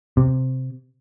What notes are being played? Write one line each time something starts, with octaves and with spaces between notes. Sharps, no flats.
C3